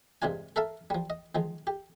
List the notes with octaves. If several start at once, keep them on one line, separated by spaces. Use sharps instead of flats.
G2 C3 G#3 D4 F4 G#5
A4 A#4 E5 F5 A5
F3 G3
D#5
D#3 F3 G#3
G4